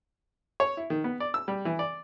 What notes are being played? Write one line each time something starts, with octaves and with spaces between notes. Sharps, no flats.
C#5
E4
D#3
B3
D5
E6
G3
E3
D5